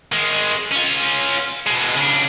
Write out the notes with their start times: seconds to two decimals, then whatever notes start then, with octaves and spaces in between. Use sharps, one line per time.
0.12 D#3 G#3
0.72 C#4 F4
1.67 B2 G#3
1.97 C#3 D4